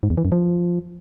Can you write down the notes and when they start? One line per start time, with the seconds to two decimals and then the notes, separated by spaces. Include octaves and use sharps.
0.03 G#2
0.10 E2
0.17 E3
0.25 F#2
0.32 F3